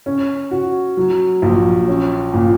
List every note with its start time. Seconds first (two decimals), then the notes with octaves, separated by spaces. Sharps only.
0.06 C#4
0.51 F#4
0.97 F#3
1.42 A#1
1.88 C#4
2.33 A#2